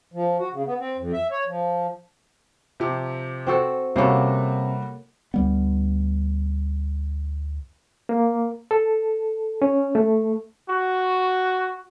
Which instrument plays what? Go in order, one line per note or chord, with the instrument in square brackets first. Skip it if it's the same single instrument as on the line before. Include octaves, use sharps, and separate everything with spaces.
[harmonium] F3
F#4
C#3
B3
C4
F2
E5
C#5
F3
[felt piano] C3 F3 G4
[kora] C4 F#4 A4
[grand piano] C3 [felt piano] G3 F#4 [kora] A#3 C#4 A4
[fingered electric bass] D2 G3 B3
[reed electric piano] A#3
A4
C#4
A3
[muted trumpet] F#4